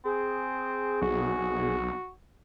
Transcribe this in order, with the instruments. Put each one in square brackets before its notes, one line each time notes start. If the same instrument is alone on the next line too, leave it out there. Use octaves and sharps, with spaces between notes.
[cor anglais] C4 [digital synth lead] G#4
[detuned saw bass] B1 [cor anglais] F#4